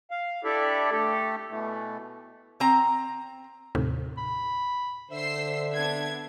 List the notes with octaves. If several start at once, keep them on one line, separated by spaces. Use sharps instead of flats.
F5
D4 E4 G4 A4 D5 E5
A3 G4 A4
B2 E3 A3
C4 A#5
D#2 A2 C3
B5
D3 C5 E5 E6 C7
B3 D4 G#6